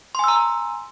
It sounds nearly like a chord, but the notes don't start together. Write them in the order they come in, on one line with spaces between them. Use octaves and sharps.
C6 G#5 E6 A#5